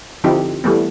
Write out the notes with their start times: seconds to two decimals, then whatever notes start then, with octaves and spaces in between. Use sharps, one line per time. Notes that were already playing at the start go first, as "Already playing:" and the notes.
0.24 D3 F3 C4 D#4 E4 G4
0.64 E3 G3 A3 B3